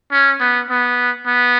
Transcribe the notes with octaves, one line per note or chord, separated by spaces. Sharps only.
C#4
B3
B3
B3